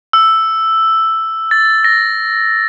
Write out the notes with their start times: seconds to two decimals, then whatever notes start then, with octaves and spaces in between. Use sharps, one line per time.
0.13 E6
1.51 A6
1.84 A#6